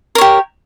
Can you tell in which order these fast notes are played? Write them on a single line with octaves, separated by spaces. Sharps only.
A#4 C#5 G4